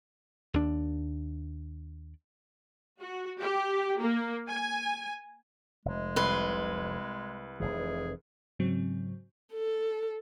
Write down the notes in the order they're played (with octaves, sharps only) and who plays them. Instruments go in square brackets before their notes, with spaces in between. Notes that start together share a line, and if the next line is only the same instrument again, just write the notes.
[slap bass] D#2 D4
[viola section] F#4
G4
A#3
G#5
[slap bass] F1 [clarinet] G#3
[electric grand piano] C2 [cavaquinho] B4 C6
[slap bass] F1 B1 E3 [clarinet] G#4
[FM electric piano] G#2 C#3 F#3 C4
[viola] A4